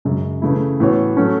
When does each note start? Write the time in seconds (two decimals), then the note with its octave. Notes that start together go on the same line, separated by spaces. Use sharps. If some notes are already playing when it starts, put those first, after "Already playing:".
0.05 F#2 C#3 G#3
0.42 C#3 E3 A3 E4
0.80 A2 E3 B3 F#4 C#5
1.17 F#3 A3 C#4